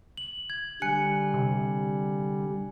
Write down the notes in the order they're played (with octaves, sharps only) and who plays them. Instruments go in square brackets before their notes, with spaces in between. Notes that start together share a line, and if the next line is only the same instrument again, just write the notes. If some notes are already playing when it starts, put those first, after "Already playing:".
[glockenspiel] F#7
G#6
[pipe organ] D3 G3 [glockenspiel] G#5 F#6 C#7
[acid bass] C3